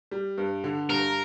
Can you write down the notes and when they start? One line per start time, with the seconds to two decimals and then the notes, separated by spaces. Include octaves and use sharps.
0.11 G3
0.38 G2
0.64 D3
0.89 G2 A#4